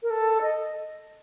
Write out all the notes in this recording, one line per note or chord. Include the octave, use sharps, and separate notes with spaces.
A#4
A4
D#5